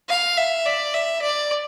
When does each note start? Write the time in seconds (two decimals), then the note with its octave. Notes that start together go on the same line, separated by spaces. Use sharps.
0.09 F5
0.37 E5
0.66 D5
0.94 E5
1.22 D5